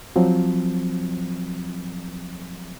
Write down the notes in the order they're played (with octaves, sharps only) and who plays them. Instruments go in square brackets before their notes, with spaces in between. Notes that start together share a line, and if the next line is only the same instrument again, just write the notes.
[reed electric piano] F3 F#3 C4